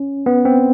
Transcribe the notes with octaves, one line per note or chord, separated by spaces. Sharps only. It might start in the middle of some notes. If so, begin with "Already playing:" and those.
Already playing: C#4
B3
C4